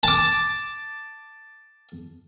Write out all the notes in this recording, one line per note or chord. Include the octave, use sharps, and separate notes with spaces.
A5 D6